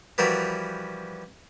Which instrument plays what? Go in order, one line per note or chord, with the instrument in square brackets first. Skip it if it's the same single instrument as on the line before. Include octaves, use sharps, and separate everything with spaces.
[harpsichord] E3 F3 G3 F#4 A#4 B4